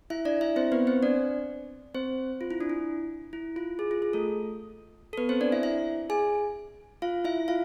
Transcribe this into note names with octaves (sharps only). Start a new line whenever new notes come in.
E4 E5
D4 D5
E4 E5
C4 C5
B3 B4
C4 C5
D4 D5
C4 C5
F4
E4
D4
E4
E4
F4
G#4
F4
G#4
A3 A4
A4
B3 B4
C4 C5
D4 D5
E4 E5
E4 E5
G#4 G#5
F4 F5
E4 E5
F4 F5